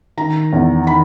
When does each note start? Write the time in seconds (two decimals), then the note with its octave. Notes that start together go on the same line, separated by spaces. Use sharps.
0.17 D#3 A#5
0.53 E2
0.87 D#3 B5